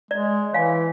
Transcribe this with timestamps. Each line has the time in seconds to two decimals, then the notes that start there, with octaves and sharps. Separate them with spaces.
0.11 G#3 D5
0.53 E3 C#5 F5 G#5